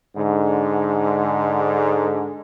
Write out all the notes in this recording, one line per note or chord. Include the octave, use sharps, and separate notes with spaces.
G#2 D3